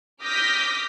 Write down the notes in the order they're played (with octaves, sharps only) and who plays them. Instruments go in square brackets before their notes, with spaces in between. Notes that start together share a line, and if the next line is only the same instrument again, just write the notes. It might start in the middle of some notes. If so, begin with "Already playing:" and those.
[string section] D6 D#6 F6 G6 A#6 B6